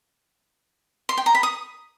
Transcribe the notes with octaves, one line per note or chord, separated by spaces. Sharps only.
C6
G5
A#5
B5
D#6